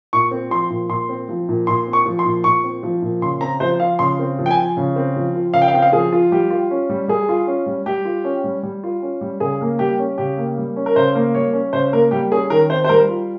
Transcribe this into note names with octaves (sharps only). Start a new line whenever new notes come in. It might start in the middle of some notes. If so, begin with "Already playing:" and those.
A#2 C#6
C4
F3 C6
A#2
A#2 C6
C4
F3
A#2
A#2 C6
C4
C#6
F3
C6
A#2
A#2 C#6
C4
F3
A#2
C#3 C6
C4 A#5
F3 C5
F4 F5
C#3 C6
C4
F3
G5
G#5
F4
C#3
C4
F3
F4
C#3 F5
G5
F5
C4 G5
F5
F3 G#4
F4
G3 G4
F4
C#4
G3
G3 G#4
F4
C#4
G3
G3 G4
F4
C#4
G3
G3
F4
C#4
G3
C#3 G#4
A#3
G3 G4
C#4
C#3 G4
A#3
G3
C#4
A#4
C#3 C5
A#3
G3 C#5
C#4
C#3 C5
A#3 A#4
G3 G4
C#4 G#4
D#3 A#4
C4 C5
C5
G3 A#4
F4